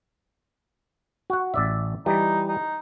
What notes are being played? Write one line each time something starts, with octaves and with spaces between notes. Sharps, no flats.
F#4 F#5
A1 D5 E5
E3 G3 D#4
D#4